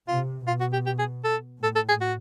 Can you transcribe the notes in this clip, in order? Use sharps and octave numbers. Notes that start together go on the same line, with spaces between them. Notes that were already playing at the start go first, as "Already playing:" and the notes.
C3 F4
B2 F4
F#4
G4
G4
G#4
A4
A2 A4
A4
G#4
F#4